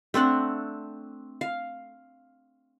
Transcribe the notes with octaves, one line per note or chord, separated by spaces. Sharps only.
A3 C4 D4 F#5
F5